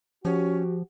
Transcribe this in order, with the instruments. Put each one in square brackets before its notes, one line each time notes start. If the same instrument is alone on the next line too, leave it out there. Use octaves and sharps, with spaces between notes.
[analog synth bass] F3 [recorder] C#4 [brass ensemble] F#4 G4